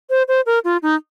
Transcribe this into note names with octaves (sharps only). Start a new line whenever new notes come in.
C5
C5
A#4
F4
D#4